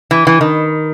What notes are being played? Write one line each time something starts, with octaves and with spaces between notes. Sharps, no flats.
E3
E3
D#3